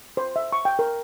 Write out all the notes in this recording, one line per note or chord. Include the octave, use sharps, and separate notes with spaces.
C5
E5
C#6
G5
A#4